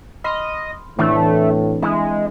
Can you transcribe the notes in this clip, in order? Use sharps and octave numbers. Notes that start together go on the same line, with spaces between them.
D#5 B5 C6 F6
A2 E3 A3 C4 D4
G#3 E4